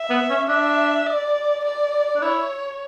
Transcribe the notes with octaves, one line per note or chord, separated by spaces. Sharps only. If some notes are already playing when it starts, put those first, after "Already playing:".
Already playing: E5
B3
C#4
D4 E5
D5
D5
D4
E4 C#5